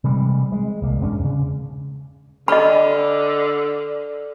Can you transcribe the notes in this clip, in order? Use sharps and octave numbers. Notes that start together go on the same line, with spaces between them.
C3 E3 G3 G#3
G#3
C2 A#3
E2 G#2 C#4 D4
C#3
D3 A4 D5 D#5 B5 F6